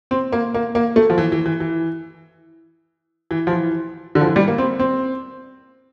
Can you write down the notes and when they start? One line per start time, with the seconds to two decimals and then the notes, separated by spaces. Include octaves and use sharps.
0.11 C4
0.32 A#3
0.54 A#3
0.75 A#3
0.96 A3
1.10 F3
1.18 E3
1.32 E3
1.46 E3
1.60 E3
3.31 E3
3.47 F3
3.51 E3
4.15 D3
4.21 F3
4.26 E3
4.36 G3
4.48 A#3
4.58 C4
4.79 C4